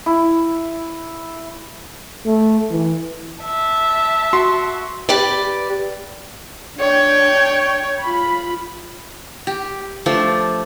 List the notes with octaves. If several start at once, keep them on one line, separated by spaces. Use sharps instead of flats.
E4
A3
E3
E5 A5
F#4 C6
G4 B4 D5
D4 C#5 G5
F4 B5
G4
F3 A3 D4